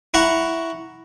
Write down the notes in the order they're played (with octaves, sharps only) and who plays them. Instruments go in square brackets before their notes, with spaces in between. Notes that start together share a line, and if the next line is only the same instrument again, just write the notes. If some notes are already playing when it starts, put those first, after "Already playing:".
[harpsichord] E4 F#5 A#5 C#6